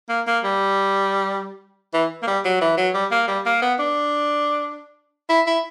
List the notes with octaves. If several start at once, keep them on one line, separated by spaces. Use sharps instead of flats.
A#3
A#3
G3
E3
A#3
G3
F#3
E3
F#3
G3
A#3
G3
A#3
B3
D4
E4
E4